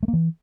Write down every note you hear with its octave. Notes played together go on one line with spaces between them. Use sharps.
A3
A#3
E3